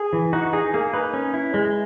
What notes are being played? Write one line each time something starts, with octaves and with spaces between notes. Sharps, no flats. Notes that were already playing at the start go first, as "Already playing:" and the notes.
Already playing: G#4
E3
D#4 F#4
D#4 G#4
A#3 G#4
D#4 B4
C#4
E4
G#3